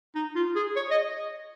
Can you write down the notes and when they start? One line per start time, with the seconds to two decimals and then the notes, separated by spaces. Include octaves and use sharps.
0.15 D#4
0.35 F4
0.56 G#4
0.76 C#5
0.91 D#5